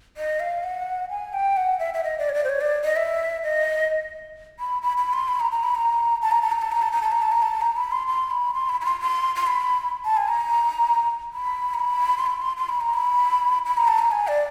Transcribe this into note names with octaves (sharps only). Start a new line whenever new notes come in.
D#5
F5
F#5
G#5
G5
F#5
E5
E5
D#5
D5
C#5
D5
C5
C#5
D5
D#5
E5
D#5
B5
B5
B5
C6
B5
A#5
A#5
B5
A#5
A5
A#5
A5
A#5
A5
A#5
A5
A#5
A5
A#5
A5
A#5
A5
A#5
B5
C6
C6
B5
C6
B5
B5
C6
C6
C6
B5
A5
G#5
A#5
B5
A#5
B5
C6
B5
C6
C6
B5
A#5
B5
B5
A#5
A5
A#5
G#5
D5